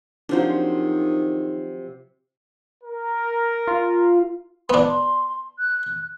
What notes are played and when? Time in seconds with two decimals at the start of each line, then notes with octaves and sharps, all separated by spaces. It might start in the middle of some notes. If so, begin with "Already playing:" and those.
0.29 C3 D#3 F3 F#3 D4 C5
2.83 A#4
3.67 F4
4.70 B3 D4 C6
5.59 F#6